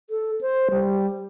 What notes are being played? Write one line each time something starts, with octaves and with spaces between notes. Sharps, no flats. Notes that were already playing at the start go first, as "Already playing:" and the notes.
A4
C5
G3